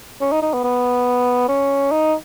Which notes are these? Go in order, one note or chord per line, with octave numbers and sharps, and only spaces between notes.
C#4
D#4
D#4
B3
B3
C#4
D#4